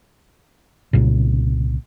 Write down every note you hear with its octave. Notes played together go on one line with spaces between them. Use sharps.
C2 A#2 C#3